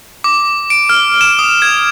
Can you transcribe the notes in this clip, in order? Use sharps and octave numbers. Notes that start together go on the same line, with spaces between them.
D6
D7
F6
E7
D#6
G#6